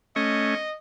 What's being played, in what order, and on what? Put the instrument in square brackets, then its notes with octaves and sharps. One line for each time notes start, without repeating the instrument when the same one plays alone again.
[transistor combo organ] A3 C#4 C#6 [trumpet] D#5